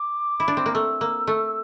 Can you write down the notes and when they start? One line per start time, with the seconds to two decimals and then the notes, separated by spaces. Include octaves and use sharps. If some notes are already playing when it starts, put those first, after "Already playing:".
Already playing: D6
0.40 E4
0.48 D4
0.57 C4
0.66 A#3
0.74 A3 E6
1.01 A#3
1.27 A3